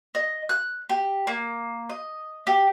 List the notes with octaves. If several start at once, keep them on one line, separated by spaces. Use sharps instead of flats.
D#5
F#6
G4
A#3
D#5
G4